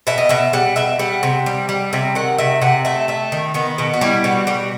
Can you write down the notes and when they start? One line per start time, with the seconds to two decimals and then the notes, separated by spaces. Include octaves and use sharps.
0.07 B2 E5
0.18 D#5
0.29 B2 E5
0.53 G3 F#5
0.76 B2 E5
0.99 G3 F#5
1.23 C3
1.46 G3
1.69 G3
1.93 C3 E5
2.15 D#3 F#5
2.38 C3 E5
2.61 C3 F#5
2.85 A3 E5
3.08 A3 E5
3.32 D#3
3.54 D#3 B3
3.78 B2 B3
3.93 F#4
4.01 G3 E4
4.24 B2 F#4
4.47 G3 F#4